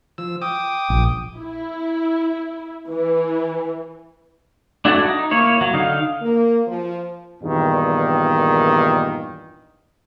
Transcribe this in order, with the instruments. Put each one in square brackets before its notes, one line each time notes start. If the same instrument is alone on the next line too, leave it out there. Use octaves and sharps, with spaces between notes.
[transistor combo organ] F3 E6
G5 D6 D#6
[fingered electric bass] A#1
[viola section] E4
E3
[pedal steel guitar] D4 E4 F#4 A4
D#4
A#3 E4 C#5
F#3
D3 D#4 F5
[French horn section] A#3
F3
[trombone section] E2 G2 A#2 D#3